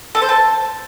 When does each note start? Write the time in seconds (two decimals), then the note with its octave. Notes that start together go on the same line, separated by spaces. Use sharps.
0.15 A4
0.22 C5
0.29 A5